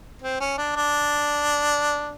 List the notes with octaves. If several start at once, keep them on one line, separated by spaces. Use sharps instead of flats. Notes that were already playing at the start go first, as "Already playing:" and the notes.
C4
C#4
D4
D4